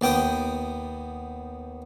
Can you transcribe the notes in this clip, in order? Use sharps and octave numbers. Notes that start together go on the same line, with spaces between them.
D#2 B3 G5 D6 D#6